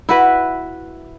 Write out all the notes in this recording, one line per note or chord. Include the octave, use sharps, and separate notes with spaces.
E4 F#4 B4